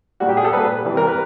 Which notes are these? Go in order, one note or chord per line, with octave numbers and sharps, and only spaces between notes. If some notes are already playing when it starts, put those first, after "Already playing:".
A#2 G3 F#4
G4
G#4
A4
A#2 G3 B4
C3 E3 G3
A#4
B4